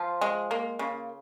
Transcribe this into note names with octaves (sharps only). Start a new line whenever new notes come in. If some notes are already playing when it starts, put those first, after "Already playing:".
Already playing: F3 F4
G#3
A#3
C#3